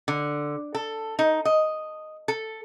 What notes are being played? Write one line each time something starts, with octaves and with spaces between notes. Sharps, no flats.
D3
A4
D#4
D#5
A4